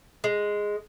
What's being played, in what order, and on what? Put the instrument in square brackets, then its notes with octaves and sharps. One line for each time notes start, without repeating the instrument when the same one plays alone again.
[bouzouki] G#3